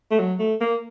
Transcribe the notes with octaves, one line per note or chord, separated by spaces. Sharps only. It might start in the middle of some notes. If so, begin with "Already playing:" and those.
A3
F#3
A3
A#3